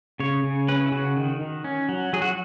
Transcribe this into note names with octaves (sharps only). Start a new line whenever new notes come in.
C#3 C#5
C#3
C#4 B4
E4
C#3 F#4
D#3
D#3
C#4
F#3
F#3 G#4
F#4